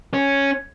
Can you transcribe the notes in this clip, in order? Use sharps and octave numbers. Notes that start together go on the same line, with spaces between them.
C#4